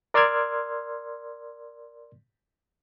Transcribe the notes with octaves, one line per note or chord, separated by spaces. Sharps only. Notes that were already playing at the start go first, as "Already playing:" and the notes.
A#4 D5 C6 E6 F6 G#6